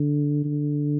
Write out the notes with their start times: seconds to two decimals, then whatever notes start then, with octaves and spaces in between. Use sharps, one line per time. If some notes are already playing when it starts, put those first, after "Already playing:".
Already playing: D3
0.45 D3